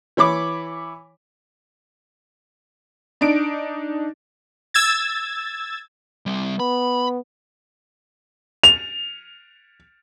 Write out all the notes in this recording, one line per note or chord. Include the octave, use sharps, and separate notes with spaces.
E3 C#5 B5 D6
D4 D#4 D7
E6 G#6 A6
G3 C4
B3 B5
F7